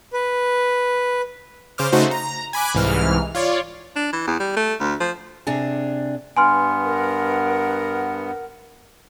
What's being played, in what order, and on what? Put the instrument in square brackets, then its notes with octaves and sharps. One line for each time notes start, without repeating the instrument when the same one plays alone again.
[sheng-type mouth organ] B4
[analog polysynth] C#3 C5 D6 F6
C#3 A3 D#4 F#4 C5
A#5
G#5 B5 D6 F#6
C2 G#2 E3 F6
F4 C#5 D5
[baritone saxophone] D4
E3
E2
G3
A3
D2
F3
[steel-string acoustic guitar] C3 D4 G#4
[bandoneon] G2 B3 [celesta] G#5 C6 F6
[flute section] A#4 F#5